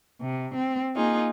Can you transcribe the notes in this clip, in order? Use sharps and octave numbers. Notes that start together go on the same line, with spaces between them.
C3
C4
A#3 D#4 F4 G#4